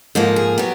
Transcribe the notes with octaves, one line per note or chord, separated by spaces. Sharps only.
G#2 F3 A#3 A4
G#4
F#3 B3 G4